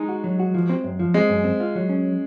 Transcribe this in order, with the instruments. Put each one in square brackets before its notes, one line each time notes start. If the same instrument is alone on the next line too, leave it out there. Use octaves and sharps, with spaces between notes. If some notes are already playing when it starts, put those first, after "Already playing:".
Already playing: [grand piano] G#3 [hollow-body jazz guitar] D#4
[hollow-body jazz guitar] F#4
F#3
F#4
F3
C4
F#2
F3
[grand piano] G#3 [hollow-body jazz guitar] C4
[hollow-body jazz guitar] F#2
C4
F4
F#3
C#4